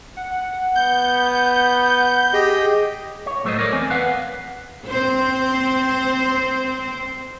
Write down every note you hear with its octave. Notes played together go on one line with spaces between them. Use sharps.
F#5
B3 G6
G4 G#4 D#5
C#5
A2 F#3 A3 G#4 C5 D#5
A#4 C#5 D5
E2 C4 G#5
B4 F5 F#5
C4 C5